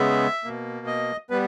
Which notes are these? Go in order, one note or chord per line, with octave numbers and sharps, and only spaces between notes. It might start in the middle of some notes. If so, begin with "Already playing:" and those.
Already playing: C#3 G#3 B3 E5
B2 A#3
D#5
G3 B3 B4